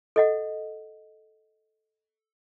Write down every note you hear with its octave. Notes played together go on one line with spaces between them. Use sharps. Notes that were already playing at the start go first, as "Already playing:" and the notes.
A4 D#5 F#5